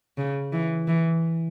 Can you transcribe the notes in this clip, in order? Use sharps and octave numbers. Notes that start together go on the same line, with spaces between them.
C#3
E3
E3